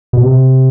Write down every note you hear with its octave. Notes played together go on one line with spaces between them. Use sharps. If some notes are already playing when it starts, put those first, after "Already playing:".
B2
C3